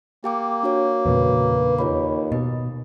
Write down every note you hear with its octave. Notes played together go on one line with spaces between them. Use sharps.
A#3 G4 G5 D6
D4 F#4 C#5
E2 A#2 C#3 B4
D#2 F4 C#5 B5
B2 D#5